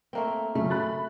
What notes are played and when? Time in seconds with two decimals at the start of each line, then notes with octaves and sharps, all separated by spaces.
0.13 A3 A#3 C4
0.55 C#3 F#3 A3
0.70 B5 F#6 A6